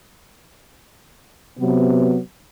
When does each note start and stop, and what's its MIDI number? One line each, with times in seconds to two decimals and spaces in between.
1.59 2.17 48
1.59 2.17 54
1.59 2.17 59